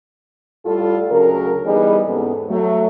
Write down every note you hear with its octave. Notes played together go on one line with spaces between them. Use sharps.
A2 G3 F4 A4
D2 C#3 F#3 A#4
E3 G3 B3 D#4 G4 G#4
E2 G#2 C3 B3 C#4 A4
F#3 A3